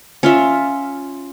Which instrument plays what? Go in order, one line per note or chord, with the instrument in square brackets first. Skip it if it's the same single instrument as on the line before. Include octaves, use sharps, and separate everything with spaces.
[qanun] C#4 F4 E5